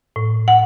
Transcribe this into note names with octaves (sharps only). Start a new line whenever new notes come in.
A2
F#5